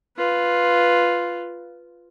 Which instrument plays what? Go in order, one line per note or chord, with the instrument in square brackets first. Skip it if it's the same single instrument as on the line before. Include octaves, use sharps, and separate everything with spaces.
[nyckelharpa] F4 B4